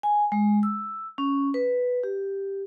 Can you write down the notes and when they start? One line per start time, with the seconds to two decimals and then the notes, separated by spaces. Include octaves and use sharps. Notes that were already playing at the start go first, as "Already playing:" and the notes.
0.03 G#5
0.32 G#3
0.63 E6
1.18 C#4
1.54 B4
2.03 G4